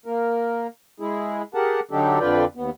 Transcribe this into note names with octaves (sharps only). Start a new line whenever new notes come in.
A#3 A#4
G#3 E4 G#4
G4 G#4 A#4 F#5 A5
D3 F#3 D4 D#4 G4 A4
F2 D3 F4 B4 D5 G5
D#2 B3